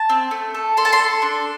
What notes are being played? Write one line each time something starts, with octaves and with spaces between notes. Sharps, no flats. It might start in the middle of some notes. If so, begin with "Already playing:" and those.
Already playing: A5
C4
A3
A4
A4 C6
A5
C6
A4
D4